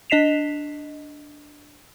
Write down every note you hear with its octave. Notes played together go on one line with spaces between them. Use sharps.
D4 D#5 B6 C7 E7 F7